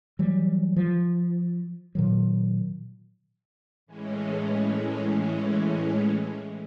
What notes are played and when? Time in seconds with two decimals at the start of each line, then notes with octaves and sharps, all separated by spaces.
0.19 E3 F#3 G3
0.76 F3
1.95 A#2 D#3 F#3
3.86 A2 E3 G#3 C#4